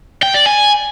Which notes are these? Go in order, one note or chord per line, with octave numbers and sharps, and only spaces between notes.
G5
D5
G#5